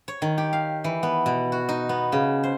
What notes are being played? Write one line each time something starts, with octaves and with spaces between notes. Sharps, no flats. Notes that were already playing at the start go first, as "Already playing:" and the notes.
C#5
D#3
G4
F5
E3
B3
B2
F#4
D#4
B3
C#3
C5